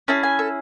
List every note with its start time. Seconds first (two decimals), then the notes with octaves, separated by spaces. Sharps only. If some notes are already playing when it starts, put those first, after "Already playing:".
0.08 C#4 E4 G#4 A5
0.23 G#5
0.39 A4